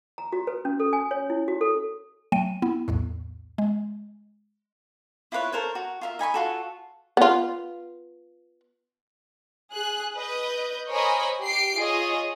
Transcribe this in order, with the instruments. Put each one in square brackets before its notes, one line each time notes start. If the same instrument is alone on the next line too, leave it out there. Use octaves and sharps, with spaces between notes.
[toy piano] A#5
F#4
B4
C#4
A4
G#5
C#5
E4
F#4
A4
[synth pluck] F#3 A3 G5 D#7
B3 E4
B1 E2 A2
G#3
[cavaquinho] E4 F4 B4 C#5
A4 A#4 C5 C#5
F#4
F4 A#4 E5
D#4 G#5 B5 C#6
F4 F#4 A4
[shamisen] B3 F4
[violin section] G#4 F#6
B4 D#5 G6
A#4 C5 C#5 D#5 G#5 B5
G4 C7 D7
F4 G#4 C#5 D#5